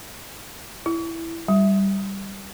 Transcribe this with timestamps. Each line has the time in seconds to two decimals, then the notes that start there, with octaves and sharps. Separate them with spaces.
0.86 E4
1.48 G3